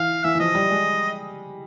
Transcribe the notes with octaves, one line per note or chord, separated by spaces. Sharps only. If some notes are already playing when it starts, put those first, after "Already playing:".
Already playing: E3 F5
E3 E5
E3
F3 D#5
G3
G#3